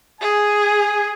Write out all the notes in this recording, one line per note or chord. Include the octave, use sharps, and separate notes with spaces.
G#4 G#5